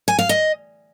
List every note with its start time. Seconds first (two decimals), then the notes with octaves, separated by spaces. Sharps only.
0.08 G#5
0.19 F5
0.29 D#5